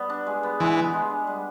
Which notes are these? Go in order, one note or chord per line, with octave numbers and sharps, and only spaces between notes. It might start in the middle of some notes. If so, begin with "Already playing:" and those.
Already playing: G3 B3
D4
G#3
B3
E3 G#3
B3
G#3
D4
G3